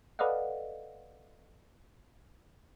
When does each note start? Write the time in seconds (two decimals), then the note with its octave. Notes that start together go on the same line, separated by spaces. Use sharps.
0.19 A4 B4 D5 D#5 F5 F#5